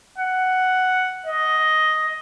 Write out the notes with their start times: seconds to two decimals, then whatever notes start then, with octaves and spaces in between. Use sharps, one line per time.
0.18 F#5
1.26 D#5